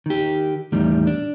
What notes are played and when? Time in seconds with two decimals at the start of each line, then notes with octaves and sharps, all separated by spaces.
0.06 D#3 G4
0.72 E2 A2 D#3 G3
1.07 D4